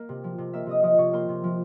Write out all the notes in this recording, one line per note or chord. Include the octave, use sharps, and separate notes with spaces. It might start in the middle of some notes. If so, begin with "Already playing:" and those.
Already playing: A#3
C3
F3
C3
A#3 E5 E6
C3 D#5 D#6
F3 D#5 D#6
C3 C#5 C#6
A#3 C5 C6
C3
F3